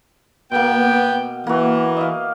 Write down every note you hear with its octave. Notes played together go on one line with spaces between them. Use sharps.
B2 A#3 B3 G5
E3 A#3 F#4
D#5 F5